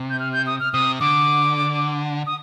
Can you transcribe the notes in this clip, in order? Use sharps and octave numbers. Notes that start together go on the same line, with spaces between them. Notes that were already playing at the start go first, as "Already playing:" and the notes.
Already playing: C3
G6
F6
G6
D#6
F6
C3 D#6
D3 D6
D#6